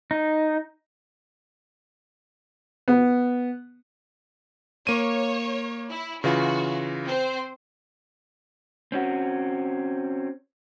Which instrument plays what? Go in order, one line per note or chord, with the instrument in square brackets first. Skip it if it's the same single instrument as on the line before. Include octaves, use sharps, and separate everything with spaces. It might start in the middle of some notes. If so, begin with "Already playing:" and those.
[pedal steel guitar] D#4
[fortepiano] B3
[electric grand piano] A#3 D#7 [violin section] C#5
[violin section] E4
[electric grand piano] C#3 E3 F4 [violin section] F#4
[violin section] C4 C5
[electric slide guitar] C4 C#4 F#4